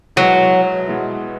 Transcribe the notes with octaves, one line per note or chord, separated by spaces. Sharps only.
B2 F#3 G#3 B3 E4
B2 G#3 B3 E4